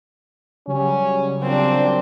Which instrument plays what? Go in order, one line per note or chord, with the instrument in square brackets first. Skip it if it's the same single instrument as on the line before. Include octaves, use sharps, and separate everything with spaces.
[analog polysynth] C#3 F#3 G3 [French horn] C#4
[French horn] A#2 [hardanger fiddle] C4 D4